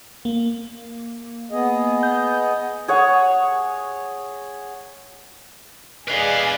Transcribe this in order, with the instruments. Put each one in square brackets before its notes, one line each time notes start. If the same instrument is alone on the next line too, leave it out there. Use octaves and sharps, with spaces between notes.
[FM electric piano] A#3
[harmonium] B3 G#4 D#5
[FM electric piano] G6
[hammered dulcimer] G#4 C#5 F#5
[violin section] G#4 D5 D#5 [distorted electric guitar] B4 F5